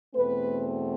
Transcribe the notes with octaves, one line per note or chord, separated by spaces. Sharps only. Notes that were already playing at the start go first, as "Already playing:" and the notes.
E2 B2 A3 C4 B4